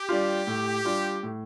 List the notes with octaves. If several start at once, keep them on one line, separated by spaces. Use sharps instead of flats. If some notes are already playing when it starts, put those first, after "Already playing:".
Already playing: G4
G3 D4 F4
A2
G3 D4 F4
A2